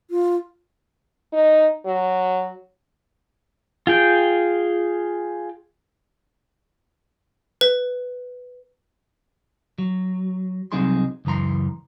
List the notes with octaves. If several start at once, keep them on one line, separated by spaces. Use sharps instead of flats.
F4
D#4
F#3
F4 G#4 G5
B4
F#3
C2 F#3 C4 D#4 G#4 C6
C#2 F#2 E3 A#5 C6